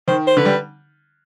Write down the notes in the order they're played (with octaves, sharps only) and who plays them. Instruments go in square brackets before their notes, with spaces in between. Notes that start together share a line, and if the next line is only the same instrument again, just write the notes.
[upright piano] D#3 [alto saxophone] C5
[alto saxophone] C5
[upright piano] D3 [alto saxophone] B4
[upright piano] G3